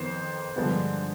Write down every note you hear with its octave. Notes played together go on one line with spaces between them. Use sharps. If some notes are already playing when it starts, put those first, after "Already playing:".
Already playing: F2 D#3 B3 C5
G2 D3 F3 G#3 B3